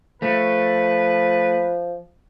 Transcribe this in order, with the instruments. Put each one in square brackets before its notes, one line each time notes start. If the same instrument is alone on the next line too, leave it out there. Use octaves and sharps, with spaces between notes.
[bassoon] F3 [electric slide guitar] A3 [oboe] B4